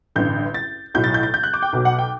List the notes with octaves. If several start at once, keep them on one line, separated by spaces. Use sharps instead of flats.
A1 G2 D3 G6
A6
B1 A2 F#3 G6
A6
G6
A6
G6
F#6
D6
G5
B1 B2 F#3
F#5
G5